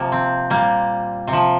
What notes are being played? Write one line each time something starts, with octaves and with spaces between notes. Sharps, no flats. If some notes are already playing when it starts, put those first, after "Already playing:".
Already playing: C3 F3 A#3
C4
A#2 G3 A#3
C3
F3